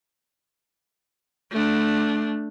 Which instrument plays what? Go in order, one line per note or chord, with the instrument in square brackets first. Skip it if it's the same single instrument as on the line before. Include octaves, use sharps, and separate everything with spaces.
[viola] A3 D4